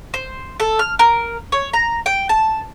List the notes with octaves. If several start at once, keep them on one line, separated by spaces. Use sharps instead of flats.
C5
A4
F6
A#4
C#5
A#5
G5
A5